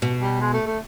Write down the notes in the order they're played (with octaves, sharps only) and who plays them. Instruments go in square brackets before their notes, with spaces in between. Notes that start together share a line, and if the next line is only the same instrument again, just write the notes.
[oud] B2
[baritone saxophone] G3
G#3
A3
A3